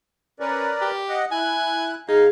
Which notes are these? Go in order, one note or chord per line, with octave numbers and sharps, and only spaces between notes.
C#4 A#4 B4 D5
G4
D#5 F#5
E4 G#5 F#6
B2 D#4 G#4 F5